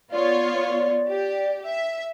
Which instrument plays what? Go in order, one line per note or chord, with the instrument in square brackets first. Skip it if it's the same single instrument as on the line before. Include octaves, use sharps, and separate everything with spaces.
[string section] B3 F4 C#5 [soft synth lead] D5
[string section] G4
E5